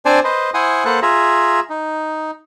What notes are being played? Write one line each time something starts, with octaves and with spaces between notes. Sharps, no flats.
C4 D4 C5 D5 G#5 A5
B4 C5 D#5
E4 C5 F#5 G#5 D#6
A#3 A4 B4 C5 F#5 F#6
F4 G#4 E5 A#5
D#4